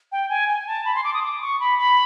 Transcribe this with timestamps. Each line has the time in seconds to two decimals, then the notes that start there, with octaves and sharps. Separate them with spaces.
0.12 G5
0.29 G#5
0.48 G#5
0.67 A5
0.85 B5
0.95 C6
1.04 D6
1.14 D#6
1.23 D6
1.42 C#6
1.60 B5
1.78 B5